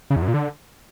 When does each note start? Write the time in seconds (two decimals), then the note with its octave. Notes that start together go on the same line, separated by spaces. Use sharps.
0.10 C#3
0.16 E2
0.22 F#2
0.28 A#2
0.34 D3